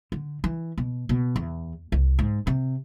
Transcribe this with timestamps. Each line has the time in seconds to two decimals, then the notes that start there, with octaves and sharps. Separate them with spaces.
0.12 D3
0.44 E3
0.78 B2
1.09 B2
1.36 E2
1.92 C2
2.19 G#2
2.47 C3